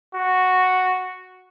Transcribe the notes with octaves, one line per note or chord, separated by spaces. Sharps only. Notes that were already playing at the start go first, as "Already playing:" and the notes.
F#4